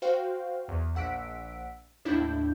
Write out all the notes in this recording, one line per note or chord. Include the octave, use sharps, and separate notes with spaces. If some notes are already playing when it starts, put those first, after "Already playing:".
F#4 C5 F5 G5
E2
A#1 F#5 E6 B6 D7
D#2 A2 D4 E4 G6